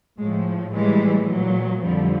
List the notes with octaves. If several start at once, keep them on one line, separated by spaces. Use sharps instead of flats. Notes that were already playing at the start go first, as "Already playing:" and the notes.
A2 F3 G#3
A2 E3 G3 G#3
A#2 F#3
F2 D3 F3 G3